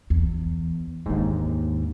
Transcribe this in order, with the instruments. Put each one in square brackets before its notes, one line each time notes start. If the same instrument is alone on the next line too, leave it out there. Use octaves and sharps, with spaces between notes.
[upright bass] E2
[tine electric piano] D#2 G#2 [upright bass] A#3 D4